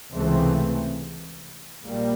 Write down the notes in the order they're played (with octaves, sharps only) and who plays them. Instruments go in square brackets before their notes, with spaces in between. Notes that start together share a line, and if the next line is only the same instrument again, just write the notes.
[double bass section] C#2 C3 E3 A3 C4
A#1 A#2 G3 A#3